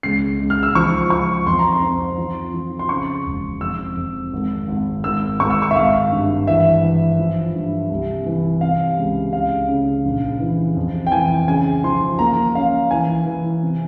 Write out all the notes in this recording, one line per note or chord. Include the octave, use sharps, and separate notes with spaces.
C#2 C7
C#2
F6
E6
F3 C#6
F3 C#6
F2 C6
A#5
C6
C4
F3
F3
C6
C#3 C#6
E1
F2 E6
F2
G#1
G#1
G#1 E6
G#1 C#6
E6
C#6
E5
G#1 F5
G2
E3 E5
E3
F3
G2
C2
E3
C3 F5
C#2
C#3 F5
C#3
A#1
E3
F2
G5
E3 G#5
C#3 G#5
F3 C6
A#3 A#5
C#4 F5
E3 G#5
E3
C3